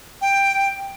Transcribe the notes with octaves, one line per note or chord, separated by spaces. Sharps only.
G5